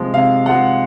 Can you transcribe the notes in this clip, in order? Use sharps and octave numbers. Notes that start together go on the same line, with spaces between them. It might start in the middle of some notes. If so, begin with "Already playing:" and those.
Already playing: C3 F3 G#3
C3 F5
F3 G#3 F#5